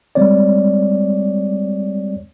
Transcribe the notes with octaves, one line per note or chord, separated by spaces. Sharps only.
G3 G#3 C4 C#5 D5